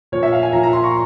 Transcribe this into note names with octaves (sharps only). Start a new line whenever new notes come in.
A#2 F3 C#5
E5
F5
G#5
A#2 F3 A#5
A#5
C6
C#6